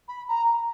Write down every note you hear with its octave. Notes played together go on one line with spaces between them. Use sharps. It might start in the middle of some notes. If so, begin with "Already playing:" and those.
B5
A#5